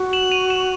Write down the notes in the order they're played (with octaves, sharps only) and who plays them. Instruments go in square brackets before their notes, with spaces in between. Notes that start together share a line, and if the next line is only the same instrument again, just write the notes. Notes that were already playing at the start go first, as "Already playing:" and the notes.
Already playing: [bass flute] F#4
[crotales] E7 F#7
D#7 F7
E7 F#7